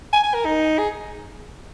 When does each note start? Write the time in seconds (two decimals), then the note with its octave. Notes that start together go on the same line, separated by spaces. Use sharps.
0.13 G#5
0.24 G#5
0.34 A#4
0.45 D#4
0.79 G#4